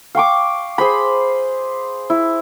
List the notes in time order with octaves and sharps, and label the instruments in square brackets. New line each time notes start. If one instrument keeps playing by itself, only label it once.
[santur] F5 G5 C#6 D6
G#4 C5 B5
E4